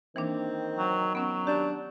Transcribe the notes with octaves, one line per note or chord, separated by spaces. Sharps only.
D#3 E3 A#3 C4 D4
F#3
F#3 B3 C#4
D4 G4